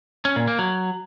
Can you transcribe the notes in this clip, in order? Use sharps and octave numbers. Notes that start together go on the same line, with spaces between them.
C#4
A#2
A#3
F#3